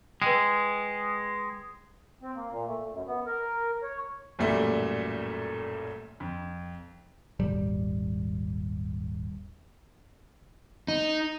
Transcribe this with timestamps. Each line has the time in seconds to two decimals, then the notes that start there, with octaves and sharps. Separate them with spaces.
0.22 G#3 B4 G5
2.22 C4
2.36 A#3
2.51 A#2
2.67 A3
2.92 F#2
3.07 B3
3.27 A#4
3.83 C#5
4.39 A1 F#2 A#2 G3 A3
6.20 F2
7.39 D#1 G#1 G3
10.88 D#4